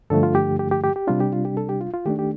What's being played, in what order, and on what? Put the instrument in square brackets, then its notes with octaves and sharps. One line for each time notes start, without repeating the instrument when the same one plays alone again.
[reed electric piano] G2 D3 F3 A3 A4
F4
G4
G4
G4
G4
G4
C3 G3 D4 F4
G4
F4
G4
A4
G4
F4
F4
D#3 A3 D4 G4
G4